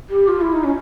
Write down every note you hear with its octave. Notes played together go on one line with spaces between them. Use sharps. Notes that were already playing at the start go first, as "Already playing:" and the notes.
G4
F4
E4
D#4
C#4